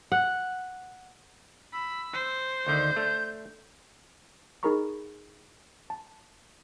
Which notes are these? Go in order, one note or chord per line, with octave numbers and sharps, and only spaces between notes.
F#5
B5 E6
C5
D2 D3 D#3 G6
A3 D4
D#4 G#4 A#4 A#5 B5 C#6
A5